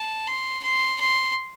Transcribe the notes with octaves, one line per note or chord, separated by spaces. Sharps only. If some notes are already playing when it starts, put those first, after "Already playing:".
Already playing: A5
C6
C6
C6